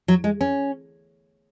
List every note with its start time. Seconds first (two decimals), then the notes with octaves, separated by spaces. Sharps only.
0.08 F#3
0.24 G#3
0.41 C#4